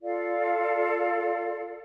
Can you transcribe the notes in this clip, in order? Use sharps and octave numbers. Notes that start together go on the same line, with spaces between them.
F4 A4 D5 F5